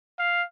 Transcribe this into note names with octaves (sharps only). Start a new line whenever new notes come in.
F5